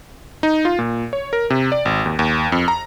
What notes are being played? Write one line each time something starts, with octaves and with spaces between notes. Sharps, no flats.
D#4
F4
A#2
C#5
A#4
C3
D5
G#1
D#2
D#2
F2
A#5